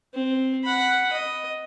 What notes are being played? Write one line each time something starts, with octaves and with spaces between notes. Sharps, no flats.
C4
F#5 B5
D#5